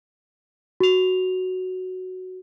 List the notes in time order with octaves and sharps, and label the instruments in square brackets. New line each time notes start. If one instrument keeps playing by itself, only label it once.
[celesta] F#4 F7